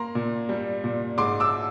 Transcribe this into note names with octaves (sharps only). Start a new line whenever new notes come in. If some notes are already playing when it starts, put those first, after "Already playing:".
Already playing: A#3 A#5 C6
A#2
G3
A#2
G#2 C6 D6
D6 E6